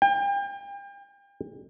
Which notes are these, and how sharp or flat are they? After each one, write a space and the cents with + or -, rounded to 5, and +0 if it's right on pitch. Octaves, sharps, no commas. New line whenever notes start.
G5 +35